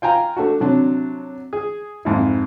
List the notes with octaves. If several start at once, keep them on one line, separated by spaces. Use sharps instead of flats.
F4 G5 G#5 A#5
A3 D4 F#4
C3 F#3 D4
G#4
F2 G#2 E4